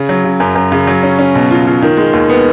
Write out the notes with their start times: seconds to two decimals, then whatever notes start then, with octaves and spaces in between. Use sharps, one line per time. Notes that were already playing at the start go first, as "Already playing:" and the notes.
Already playing: C#3
0.09 F#3
0.24 C#3
0.40 F#2
0.55 F#2
0.72 C#3
0.87 F#3
1.03 C#4
1.19 C#4
1.35 B2
1.51 F4
1.67 F4
1.82 D#3
1.97 G#3
2.13 D#2
2.30 B3